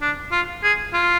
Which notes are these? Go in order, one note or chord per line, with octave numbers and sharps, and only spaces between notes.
D4
F4
G#4
F4